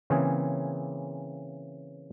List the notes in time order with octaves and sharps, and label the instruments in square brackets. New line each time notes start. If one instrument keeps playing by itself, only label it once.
[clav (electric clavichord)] C#3 E3 A#3 C4 G#4